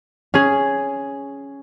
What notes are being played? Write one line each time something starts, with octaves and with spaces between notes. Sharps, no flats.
C#4 G#4